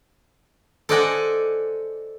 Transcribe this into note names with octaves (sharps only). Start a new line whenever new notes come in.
A4 C5 D5 D#5 F#5 G#5